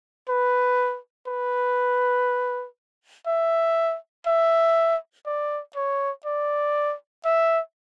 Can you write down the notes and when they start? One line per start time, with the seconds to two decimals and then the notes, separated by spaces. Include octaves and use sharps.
0.29 B4
1.27 B4
3.27 E5
4.27 E5
5.26 D5
5.76 C#5
6.26 D5
7.25 E5